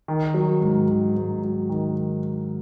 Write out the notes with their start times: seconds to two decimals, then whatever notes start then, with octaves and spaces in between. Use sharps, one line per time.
0.08 D#3
0.34 F#3
0.61 G#2
0.89 D#3
1.16 G#2
1.42 F#3
1.69 D#3